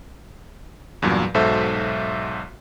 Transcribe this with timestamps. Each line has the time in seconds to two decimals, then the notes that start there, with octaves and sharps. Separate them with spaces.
1.02 E2 G2 A#2 F#3
1.34 B1 G#2 F#4 A4 C5 E5